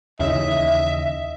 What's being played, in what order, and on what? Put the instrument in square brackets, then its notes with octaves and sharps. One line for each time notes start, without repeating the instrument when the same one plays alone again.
[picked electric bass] D#2 C#3 E3 [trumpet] D#5 [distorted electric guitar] E5